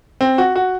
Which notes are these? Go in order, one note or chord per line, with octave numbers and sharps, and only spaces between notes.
C4
F#4
F#4